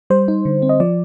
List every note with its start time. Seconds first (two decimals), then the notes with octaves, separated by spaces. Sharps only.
0.10 G3 C5
0.28 D#4
0.45 D3
0.62 C4
0.69 D#5
0.80 F3 D5